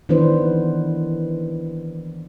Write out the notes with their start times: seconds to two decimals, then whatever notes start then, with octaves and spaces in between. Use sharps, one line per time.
0.09 D#3 E3 B3 D4 B4 C5